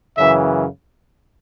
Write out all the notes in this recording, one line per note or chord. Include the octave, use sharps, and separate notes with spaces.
F#2 C#3 E3 E5